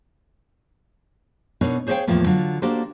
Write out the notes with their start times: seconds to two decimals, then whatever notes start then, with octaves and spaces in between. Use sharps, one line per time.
1.61 B2 B3 D4 D#4 A#4 C#5
1.87 G#4 C5 C#5 D#5 F5 G5
2.07 E2 A2 F3 A#3 B3
2.26 D3 F#3 F4
2.62 A#3 D4 F#4 G4 A4 C5